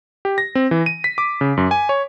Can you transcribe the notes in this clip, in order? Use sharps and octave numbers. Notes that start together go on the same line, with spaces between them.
G4
A#6
C4
E3
D#7
B6
D6
C#3
F#2
G#5
C#5